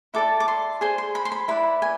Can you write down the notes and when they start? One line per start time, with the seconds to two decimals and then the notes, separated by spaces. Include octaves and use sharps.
0.14 E4 A4 D5 D6
0.40 D6
0.48 C6
0.81 G#4 C5 C6
0.98 C6
1.15 B5
1.25 C6
1.32 B5
1.48 E4 B4 D5 B5
1.82 G#5